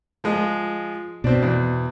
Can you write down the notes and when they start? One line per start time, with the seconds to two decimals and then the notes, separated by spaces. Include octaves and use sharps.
0.24 F3 G#3 D#5
1.24 B2 C4 D4
1.42 E2